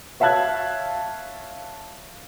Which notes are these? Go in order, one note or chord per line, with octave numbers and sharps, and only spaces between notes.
C#5 E5 F5 A5 F#6 G#6